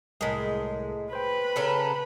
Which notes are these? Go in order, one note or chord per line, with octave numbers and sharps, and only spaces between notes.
C2 A2 G#3 A#4 B6
B4 C5 G5 B5
C#3 A4 A#4